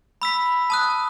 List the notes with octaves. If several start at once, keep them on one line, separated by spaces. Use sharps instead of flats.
B5 E6 B6
A5 D#6 F#6